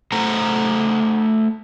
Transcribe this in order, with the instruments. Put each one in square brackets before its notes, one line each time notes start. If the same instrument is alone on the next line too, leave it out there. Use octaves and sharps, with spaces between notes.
[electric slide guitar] A3 A4 C5 F#5 A#5